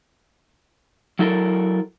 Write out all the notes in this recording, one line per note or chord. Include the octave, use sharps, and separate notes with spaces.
F#3 E4 A4 A#4